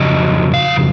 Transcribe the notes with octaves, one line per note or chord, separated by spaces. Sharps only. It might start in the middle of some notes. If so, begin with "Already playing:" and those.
Already playing: F2 C#3 F#3 D#5
F5